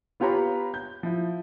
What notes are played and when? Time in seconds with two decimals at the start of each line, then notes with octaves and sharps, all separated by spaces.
0.20 B3 F4 G4 C#5 A#5 B5
0.74 G6
1.03 F3 E4